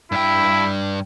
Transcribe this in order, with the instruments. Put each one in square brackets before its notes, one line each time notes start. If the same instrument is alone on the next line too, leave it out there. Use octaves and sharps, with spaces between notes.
[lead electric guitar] G2 G5 [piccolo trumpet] E4